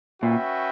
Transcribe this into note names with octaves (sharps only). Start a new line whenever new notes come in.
A#2 C#4 F#4 B4 E5 G5